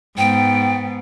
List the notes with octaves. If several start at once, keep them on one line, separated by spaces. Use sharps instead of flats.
G#2 B3 G5